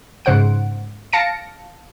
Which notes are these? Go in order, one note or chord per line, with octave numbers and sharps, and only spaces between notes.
G#2 C#3 C5 F#5 D7
F5 A5 A#6 C#7 D7